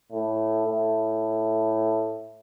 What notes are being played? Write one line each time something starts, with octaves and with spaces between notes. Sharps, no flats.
A2
A2